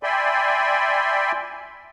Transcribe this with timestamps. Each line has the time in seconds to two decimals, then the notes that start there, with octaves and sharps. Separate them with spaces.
0.03 D5 E5 G5 G#5 B5 C6